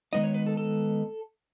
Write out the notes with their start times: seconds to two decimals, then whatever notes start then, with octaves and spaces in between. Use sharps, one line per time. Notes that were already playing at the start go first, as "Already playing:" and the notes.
0.13 D#3 G#3 B3 D#4 D#5
0.24 C#5
0.34 B4
0.47 A4
0.57 A4